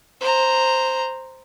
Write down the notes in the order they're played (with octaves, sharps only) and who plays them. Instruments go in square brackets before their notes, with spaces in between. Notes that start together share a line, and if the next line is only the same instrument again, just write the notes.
[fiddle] C5 A#5